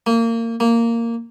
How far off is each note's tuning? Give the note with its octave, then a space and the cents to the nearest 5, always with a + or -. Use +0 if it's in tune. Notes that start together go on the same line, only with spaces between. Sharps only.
A#3 -25
A#3 -10